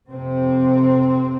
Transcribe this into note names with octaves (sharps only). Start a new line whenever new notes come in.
F2 C3 C4